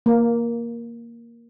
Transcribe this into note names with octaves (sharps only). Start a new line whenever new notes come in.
A#3